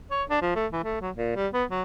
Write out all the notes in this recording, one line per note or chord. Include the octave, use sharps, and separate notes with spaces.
C#5
D4
F3
A3
E3
A3
F#3
A#2
G3
B3
F#3